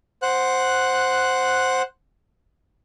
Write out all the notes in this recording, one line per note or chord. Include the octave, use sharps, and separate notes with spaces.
C5 F#5 F#6